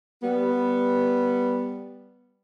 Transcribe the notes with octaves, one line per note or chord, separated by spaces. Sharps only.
G3 B3